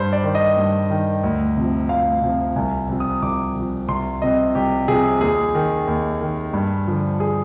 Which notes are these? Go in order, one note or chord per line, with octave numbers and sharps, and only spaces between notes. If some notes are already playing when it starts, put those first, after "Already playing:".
Already playing: G2 C5
D5
D#3
D#5
G2
D#3
D2
C3 F3
D2 F5
C3 F3
C2 G#5
C3 F3
D#6
C2 D6
C3 F3
C2 C6
C3 F3 D#5
C2 G4
C3 F3 G#4
D#2 G#4
D#3
D#2
D#3
G2
D3 F3
G#4